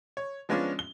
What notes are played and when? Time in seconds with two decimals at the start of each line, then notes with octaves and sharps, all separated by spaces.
0.17 C#5
0.49 F3 G#3 B3 C#4 D4 F4
0.79 G7